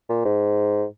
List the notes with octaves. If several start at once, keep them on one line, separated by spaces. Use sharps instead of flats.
A#2
G#2